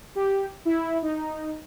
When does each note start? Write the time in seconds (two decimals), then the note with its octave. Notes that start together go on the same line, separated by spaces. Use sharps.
0.15 G4
0.65 E4
1.03 D#4